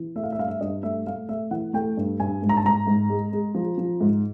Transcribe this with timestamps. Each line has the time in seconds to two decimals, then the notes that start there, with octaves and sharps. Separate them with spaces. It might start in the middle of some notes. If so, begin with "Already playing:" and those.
Already playing: E3
0.15 A3 E5
0.23 F5
0.32 E5
0.38 G2 F5
0.48 E5
0.61 G2 D#5
0.83 A3 E5
1.06 A3 F5
1.29 A3 E5
1.51 E3 F#5
1.73 A3 G5
1.97 G2
2.20 G2 G#5
2.42 G#2
2.49 A#5
2.57 A5
2.65 G#2 A#5
2.87 G#2
3.10 G#3
3.33 G#3
3.55 F3
3.78 F3
4.01 G#2